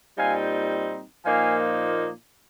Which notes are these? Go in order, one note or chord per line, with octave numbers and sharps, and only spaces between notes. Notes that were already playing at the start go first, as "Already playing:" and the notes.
A#2 G3 C4 D#4 F5 G#5
A#2 F3 A#3 D#4 F5 G#5